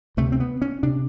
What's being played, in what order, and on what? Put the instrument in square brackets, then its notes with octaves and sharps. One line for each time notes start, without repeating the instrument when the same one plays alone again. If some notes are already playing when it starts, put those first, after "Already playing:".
[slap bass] D2 C3 A3
C4
B3
C#4
C3 D4